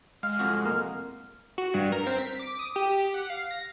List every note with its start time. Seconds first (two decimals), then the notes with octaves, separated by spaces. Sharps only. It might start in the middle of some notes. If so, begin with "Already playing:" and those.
0.23 G#3 F5 F6
0.39 C2 F2 F#4
0.65 A#3 F6
1.58 F#4
1.74 G2
1.92 A#4
2.07 C4
2.19 B6
2.39 D6
2.59 D#6
2.76 G4
3.14 F#5
3.30 F5
3.51 A#6